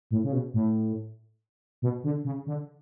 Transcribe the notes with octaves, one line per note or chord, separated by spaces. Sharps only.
A2
C#3
B2
A2
B2
D3
C#3
D3